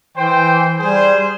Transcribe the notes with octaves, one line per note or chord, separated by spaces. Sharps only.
E3 C5 G5
G3 G#4 C5